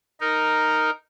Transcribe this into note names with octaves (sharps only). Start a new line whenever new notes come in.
D#4 A#4